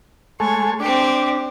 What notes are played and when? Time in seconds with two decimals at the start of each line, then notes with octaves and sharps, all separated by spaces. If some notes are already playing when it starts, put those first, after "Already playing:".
0.40 G#3 A3 C#5
0.80 C4 D4 G4